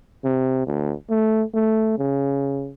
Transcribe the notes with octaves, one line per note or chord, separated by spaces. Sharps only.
C3
D2
A3
A3
C#3